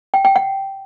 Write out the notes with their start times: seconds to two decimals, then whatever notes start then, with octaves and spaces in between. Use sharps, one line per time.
0.14 G5
0.25 G5
0.36 F#5